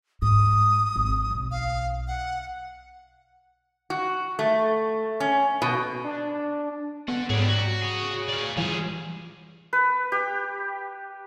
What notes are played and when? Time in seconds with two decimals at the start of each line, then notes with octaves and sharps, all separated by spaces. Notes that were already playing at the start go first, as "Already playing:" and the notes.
0.22 G#2 D#6
0.96 G#1
1.31 B1
1.51 F5
2.08 F#5
3.90 F#4
4.39 A3
5.20 C#4
5.62 B2
6.04 D4
7.08 B3 A4 F#5
7.30 G#2 F#3 G3 G#4 D5
7.49 F#4
7.82 G#4 C#5
8.29 D5 F5
8.57 E3 G3 F4 G#4
9.73 B4
10.12 G4